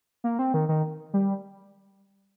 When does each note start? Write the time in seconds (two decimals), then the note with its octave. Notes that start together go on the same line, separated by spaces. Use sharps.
0.24 A#3
0.39 C4
0.54 D#3
0.69 D#3
1.14 G3